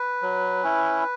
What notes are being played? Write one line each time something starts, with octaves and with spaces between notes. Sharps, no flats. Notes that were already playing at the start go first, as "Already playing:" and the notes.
Already playing: B4
F#3
C#4 E4